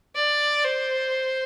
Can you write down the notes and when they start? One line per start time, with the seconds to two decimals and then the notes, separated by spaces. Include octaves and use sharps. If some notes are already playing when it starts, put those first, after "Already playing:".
0.15 D5
0.65 C5